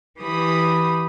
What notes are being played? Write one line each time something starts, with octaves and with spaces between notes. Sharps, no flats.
E3 G4 B5 D#6